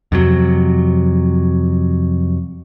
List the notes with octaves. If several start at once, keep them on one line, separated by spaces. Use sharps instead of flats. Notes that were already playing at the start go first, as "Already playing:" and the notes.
F2 C3 F#3